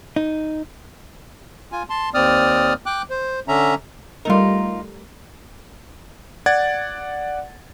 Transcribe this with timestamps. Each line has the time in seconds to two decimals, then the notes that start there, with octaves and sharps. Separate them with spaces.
0.16 D#4
1.72 F4 G#5
1.90 A5 C6
2.14 D#2 C4 D5 D#6 F6
2.86 G5 D6 F#6
3.10 C5
3.48 D3 C#4 E5 A#5
4.25 G3 A3 D#4 F4 A#4
6.46 D5 F#5 G#6 A6